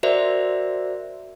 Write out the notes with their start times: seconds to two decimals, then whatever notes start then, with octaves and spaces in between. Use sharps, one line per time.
0.03 F#4 A#4 C5 D5 E5